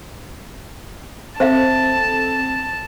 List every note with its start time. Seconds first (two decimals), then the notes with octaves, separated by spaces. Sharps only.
1.40 C4 A4 C5 E5 F5 A5